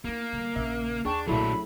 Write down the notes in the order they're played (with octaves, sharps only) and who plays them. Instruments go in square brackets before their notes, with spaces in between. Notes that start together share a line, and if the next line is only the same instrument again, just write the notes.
[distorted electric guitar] A#3 [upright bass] D4 E4
[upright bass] D3 G3
[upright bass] A#1 C#3 [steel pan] E5
[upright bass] D#2 [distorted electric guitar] D4 [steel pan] G#4 G5 A5 [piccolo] C#6
[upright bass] B1 A#2 [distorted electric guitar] F#3 D4 [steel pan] A3 E4 A4 [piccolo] B5